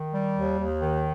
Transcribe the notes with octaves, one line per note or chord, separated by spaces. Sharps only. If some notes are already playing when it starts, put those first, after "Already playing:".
Already playing: D#3
G3
D#2
D#2
D#3